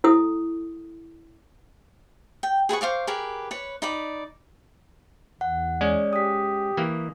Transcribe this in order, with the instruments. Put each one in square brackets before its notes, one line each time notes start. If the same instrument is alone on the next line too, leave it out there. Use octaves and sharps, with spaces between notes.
[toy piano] E4 A4 D#6
[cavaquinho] G5
G#4 B4 F#5 C#6
C5 F5 C#6 D6
G4 G#4 A#4 B4
B4 C#5
D#4 D5 B5
[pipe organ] E2 [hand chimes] F#5
[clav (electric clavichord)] G#3 C#4 [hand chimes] D5
[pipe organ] G4 [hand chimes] D#6 B6
[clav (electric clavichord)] E3 A#3